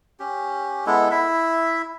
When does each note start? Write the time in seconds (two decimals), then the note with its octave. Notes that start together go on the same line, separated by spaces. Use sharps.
0.20 C#4 G4
0.86 G#3 B3 E4 A4
1.11 E4 E5